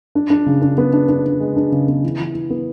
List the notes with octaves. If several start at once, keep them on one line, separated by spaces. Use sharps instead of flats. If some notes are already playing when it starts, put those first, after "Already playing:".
D4
D4
C#3
D4
B3
D4
D4
D4
G#3
D4
C#3
B3
E3
E3
E3
B3